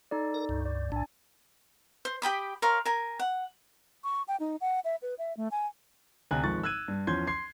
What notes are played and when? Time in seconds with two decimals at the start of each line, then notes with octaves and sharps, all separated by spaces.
0.11 D#4 A4 D5
0.34 A#4
0.49 C#2 G2
0.66 D5
0.92 B1 A2 D4 G#5
2.05 C5
2.22 G4 G5 B5 D#6
2.62 A#4 C#5 F5 C6
2.85 A#4 G#5
3.19 F#5
4.04 C#6
4.28 G5
4.40 D#4
4.61 F#5
4.85 E5
5.02 B4
5.19 E5
5.37 A3
5.51 G#5
6.31 D2 C3 G#5 F#6
6.44 G#1 F3 G#3 C#6 A6
6.63 E6 F#6 G#6 D#7
6.88 G2
7.07 E2 F3 C#4 C6 G6 G#6
7.27 C6 G#6 C7